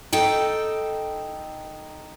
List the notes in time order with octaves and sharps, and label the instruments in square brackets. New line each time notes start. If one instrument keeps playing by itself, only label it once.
[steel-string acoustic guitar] D#4 A4 G5